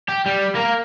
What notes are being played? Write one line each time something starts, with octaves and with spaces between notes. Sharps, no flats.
G4
G3
A#3 A#4